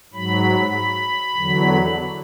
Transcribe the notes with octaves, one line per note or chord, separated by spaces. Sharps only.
G#2 F#3 B5
E2 D3 F#3